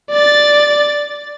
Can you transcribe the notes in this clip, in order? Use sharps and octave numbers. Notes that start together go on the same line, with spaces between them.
D5 A6